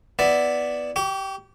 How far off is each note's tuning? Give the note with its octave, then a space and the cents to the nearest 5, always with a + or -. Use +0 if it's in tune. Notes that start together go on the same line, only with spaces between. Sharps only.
B3 +0 E4 +0 D5 +0
G4 -15 C#6 +45